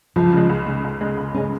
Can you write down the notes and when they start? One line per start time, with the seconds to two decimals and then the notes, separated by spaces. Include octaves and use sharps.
0.16 C#2 F3
0.33 C#3 G#3
0.49 C#2
0.67 C#3 G#3
0.84 C#2
1.01 C#3 G#3
1.17 C#2
1.34 C#3 G#3 C#4